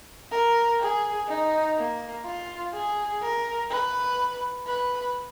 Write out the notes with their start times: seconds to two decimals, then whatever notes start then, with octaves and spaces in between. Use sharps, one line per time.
0.32 A#4
0.80 G#4
1.28 D#4
1.77 A#3
2.25 F4
2.74 G#4
3.22 A#4
3.70 B4
4.67 B4